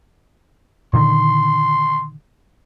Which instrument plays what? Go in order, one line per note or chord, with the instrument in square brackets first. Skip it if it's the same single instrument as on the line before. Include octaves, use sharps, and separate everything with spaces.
[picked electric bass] A#2 D3 D#3 [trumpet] C6